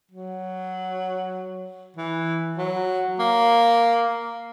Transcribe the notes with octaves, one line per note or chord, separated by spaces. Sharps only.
F#3
E3
F#3
A#3